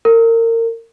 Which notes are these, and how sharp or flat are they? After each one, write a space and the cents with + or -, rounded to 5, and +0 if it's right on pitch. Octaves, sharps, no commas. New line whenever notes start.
A#4 -30